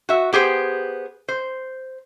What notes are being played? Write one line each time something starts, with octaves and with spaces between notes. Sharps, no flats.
F#4 E5
B3 G4 G#4 C5
C5